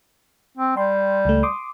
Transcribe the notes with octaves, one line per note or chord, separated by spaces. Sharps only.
C4
G3 G5 C6
C#2 A3
C6 D6 D#6